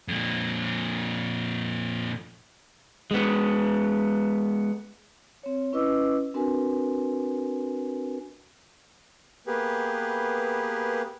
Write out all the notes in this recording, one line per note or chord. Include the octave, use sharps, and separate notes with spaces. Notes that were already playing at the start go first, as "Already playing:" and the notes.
F2 A#2
G#3 B3
C4 C#5
C#4 E4 B4 D#5 D6 E6
C4 D4 F#4 A#4 B4 G#5
A#3 B3 G4 G#4 B4